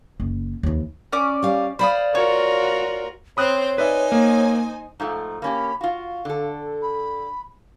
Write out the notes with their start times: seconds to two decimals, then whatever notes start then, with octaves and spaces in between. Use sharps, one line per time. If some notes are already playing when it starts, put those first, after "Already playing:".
0.20 F#1
0.63 D#2 E3
1.12 C#4 D5 D6
1.43 G3 F5
1.79 C5 D5 F5 B5 C6 D#6
2.15 F4 F#4 A#4 C#5
3.37 C4 C5 C#5 B5 D#6 F#6
3.78 D#4 B4 C5 D5 E5 G#5
4.12 A#3
5.00 G#2 F3 A3 A#5
5.42 A#3 C#4 G4 B5
5.81 F4 F#4 F5
6.25 D3 A4
6.82 B5